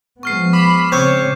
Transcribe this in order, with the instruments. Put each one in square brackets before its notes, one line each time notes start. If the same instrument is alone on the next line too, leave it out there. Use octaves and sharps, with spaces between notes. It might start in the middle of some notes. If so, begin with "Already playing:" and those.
[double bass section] F3 G#3 B3 [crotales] C#6 F6 C7
[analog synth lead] B5 [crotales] D6
[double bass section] C#3 G#3 [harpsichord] C4 [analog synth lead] C#5 [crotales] G6